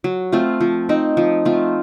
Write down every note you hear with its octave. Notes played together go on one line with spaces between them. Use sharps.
F#3
A3 C4 F4
F3
C4 D#4
F3
A3 C4 F4